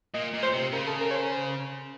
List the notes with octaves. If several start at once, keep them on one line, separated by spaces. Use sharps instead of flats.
A#2 D#5
A#2
C5
C3
C#3 A#4
A4
A#4
C#5
C5
C5